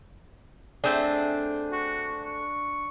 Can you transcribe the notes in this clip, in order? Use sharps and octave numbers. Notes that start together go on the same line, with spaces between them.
A3 C4 D4 G#4
F#4
C#6